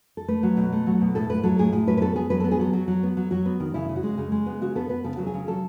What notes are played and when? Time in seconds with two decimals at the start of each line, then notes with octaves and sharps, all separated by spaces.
0.17 A4
0.28 A3 B4
0.43 F#3
0.57 B2
0.73 A3
0.87 F#3
1.01 B2
1.15 A2 A4
1.29 A2 B4
1.43 F#3 A4
1.58 A2 G#4
1.73 A2 G#4
1.87 F#3 B4
1.97 B4
2.02 B3 A4
2.16 B3 G#4
2.30 F#3 B4
2.40 B3 A4
2.51 G#4
2.59 F#3 A4
2.73 F#3
2.88 F#3
3.03 B3
3.17 F#3
3.31 F#3 F#4
3.45 B3
3.60 D#3
3.74 C#3 E4
3.89 C#3
3.96 F#4
4.03 G#3
4.17 C#3 G#4
4.32 G#3
4.46 B3
4.61 C#3 F#4
4.75 B3 A4
4.89 B3 B4
5.04 C#3 A4
5.16 F#3 F#4
5.27 G#4
5.34 C#3
5.47 F#3 A4